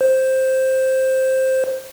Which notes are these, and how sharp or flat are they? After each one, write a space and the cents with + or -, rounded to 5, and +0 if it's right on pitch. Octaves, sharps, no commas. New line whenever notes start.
C5 +5